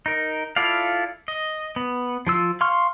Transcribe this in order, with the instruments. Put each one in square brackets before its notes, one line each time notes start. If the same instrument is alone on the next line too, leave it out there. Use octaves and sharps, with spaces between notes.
[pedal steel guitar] D#4 A#4
E4 F4 A4 D5 F5
D#5
B3
F3 F4 E6
F5 C6 C#6 F6